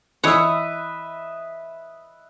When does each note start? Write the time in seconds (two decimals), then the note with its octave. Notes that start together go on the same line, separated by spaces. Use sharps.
0.23 E3 B4 C#5 D#5 E5 F#5